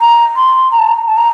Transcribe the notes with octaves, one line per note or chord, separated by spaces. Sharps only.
A#5
C6
A#5
A5
A#5
A5
A#5